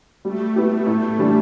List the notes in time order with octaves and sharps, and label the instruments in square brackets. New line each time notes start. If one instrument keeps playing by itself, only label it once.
[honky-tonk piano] G3 [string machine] A3
[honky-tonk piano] B3 E4 G4
A2
E3 G3 D4